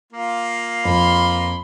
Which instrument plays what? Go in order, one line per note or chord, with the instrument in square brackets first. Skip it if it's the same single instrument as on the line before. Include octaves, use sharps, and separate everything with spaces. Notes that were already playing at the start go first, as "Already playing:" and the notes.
[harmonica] A#3 F4
[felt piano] F2 [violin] B5 C6